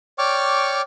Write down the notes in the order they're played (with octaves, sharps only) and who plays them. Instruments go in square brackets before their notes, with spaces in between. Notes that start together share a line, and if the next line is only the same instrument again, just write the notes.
[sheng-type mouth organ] C#5 D5 G5 C#6 D6 F6